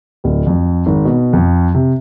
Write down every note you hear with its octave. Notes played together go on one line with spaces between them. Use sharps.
D1
F2
G#1
B2
F2
C3